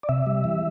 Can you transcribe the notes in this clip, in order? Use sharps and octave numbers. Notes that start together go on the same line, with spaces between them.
D5
C3 E5
G3
E3